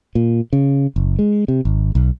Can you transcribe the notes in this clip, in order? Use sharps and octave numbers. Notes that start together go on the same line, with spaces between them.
A#2
C#3
F#1
G#3
C3
G#1
B1